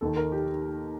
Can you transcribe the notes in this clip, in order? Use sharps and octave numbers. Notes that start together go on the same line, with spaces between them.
D#2 D#3 A4
A#4
G4